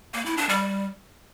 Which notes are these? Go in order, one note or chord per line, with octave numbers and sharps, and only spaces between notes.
A#3
E4
D4
G3